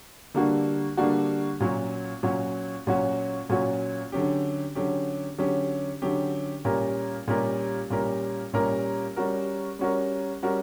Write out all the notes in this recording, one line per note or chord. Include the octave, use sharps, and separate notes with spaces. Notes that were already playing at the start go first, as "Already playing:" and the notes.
D3 G3 A#3 D4 F#4
D3 G3 A#3 D4 F#4
A#2 F#3 C#4 F#4
A#2 F#3 C#4 F#4
A#2 F#3 C#4 F#4
A#2 F#3 C#4 F#4
D3 F#3 C#4 G4
D3 F#3 C#4 G4
D3 F#3 C#4 G4
D3 F#3 C#4 G4
A#2 G3 C#4 G4 A#4
A#2 G3 C#4 G4 A#4
A#2 G3 C#4 G4 A#4
A#2 G3 C#4 G4 A#4
G3 C#4 F#4 A#4
G3 C#4 F#4 A#4
G3 C#4 F#4 A#4